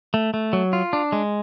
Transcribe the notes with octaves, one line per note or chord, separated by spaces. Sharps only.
A3
A3
F#3
F4
D4
G#3